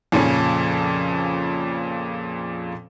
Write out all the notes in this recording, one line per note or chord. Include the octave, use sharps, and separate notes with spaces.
F2 A#2 C#3 C#4